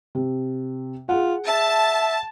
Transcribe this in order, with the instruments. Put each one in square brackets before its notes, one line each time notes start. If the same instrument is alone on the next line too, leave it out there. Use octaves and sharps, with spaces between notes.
[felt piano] C3
[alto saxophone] F4 [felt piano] G#4 F#5
[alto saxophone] E5 [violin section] A5